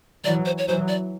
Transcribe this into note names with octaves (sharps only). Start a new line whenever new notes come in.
E3 F#3 D5
C5
C#5
E3 F#3 C5
D5